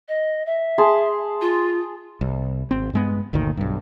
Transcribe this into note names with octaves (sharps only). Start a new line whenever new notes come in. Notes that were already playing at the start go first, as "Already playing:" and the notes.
D#5
E5
G#4 A5 C6
F4
C2
G#1 C4
G2 G#3 B3
G1 D2 A#2 D#3
B1 G2